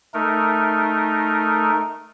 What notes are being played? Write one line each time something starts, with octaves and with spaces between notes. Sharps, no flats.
A3 D#4 A#4